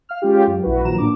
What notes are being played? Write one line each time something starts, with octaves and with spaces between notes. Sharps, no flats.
F5 F6
G#3 C#4 F4 G4
F#2
A#1 E4 F#4 B4
A#2 D#3 F3 F#3 A#5 E7
A2 A#3 D4 D6